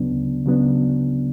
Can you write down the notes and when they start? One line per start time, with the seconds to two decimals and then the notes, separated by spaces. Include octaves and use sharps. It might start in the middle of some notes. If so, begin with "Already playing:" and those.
Already playing: D2 C#3 F#3 B3 D4
0.11 D2
0.46 C#3 F#3 B3 D4